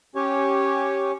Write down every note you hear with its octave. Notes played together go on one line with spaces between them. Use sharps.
C#4 G4 C#5